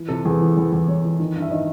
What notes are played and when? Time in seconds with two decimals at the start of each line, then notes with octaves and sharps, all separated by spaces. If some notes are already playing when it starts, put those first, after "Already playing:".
Already playing: E3
0.09 C3 A4
0.25 E2 G#4
0.41 E3
0.57 E2
0.72 E2
0.88 E2 C#5
1.04 E3
1.19 D#3
1.36 G2
1.42 E5
1.51 D#3 D#5